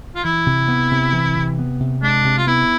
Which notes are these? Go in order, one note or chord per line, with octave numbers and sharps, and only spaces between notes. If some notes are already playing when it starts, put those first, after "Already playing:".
F4
E3 E4
C3
B3
C3
E3
C3
B3
C3
G#3 D4
C3
F4
B3 E4